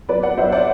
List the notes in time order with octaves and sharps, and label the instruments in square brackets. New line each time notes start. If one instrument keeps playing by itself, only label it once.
[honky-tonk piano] F#3 B4 D5
D5 F#5
F#3 C5 E5
D5 F#5